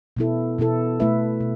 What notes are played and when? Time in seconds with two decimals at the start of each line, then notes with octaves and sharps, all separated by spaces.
0.17 B2 B3 E4 A4
0.58 B2 B3 E4 A4
1.00 B2 A3 E4 B4 E5
1.40 B2